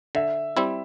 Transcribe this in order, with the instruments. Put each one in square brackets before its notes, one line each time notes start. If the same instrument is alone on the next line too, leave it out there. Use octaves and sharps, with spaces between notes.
[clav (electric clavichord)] D3 [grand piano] E5
[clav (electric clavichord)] G3 C4 E4